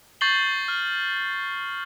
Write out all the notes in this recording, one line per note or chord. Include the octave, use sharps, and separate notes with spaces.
C#6 G6 A6 C7 F#7 G7
F6